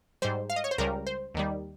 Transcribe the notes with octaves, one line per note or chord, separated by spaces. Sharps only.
G#2 G3 C5
F5
D#5
C#5
C5
C#2 C#3 G3 A#4
C5
D#2 D#3 G3